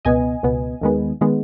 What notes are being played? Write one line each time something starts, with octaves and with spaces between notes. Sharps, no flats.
C#2 B2 B3 D#5 G#5
C#2 B2 B3
D#2 D#3 G#3 B3
D#3 G#3 B3